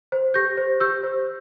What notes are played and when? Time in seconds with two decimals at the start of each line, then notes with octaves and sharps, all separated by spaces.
0.12 C5
0.34 G4 G6 A#6
0.57 C5
0.80 G4 E6 G6
1.03 C5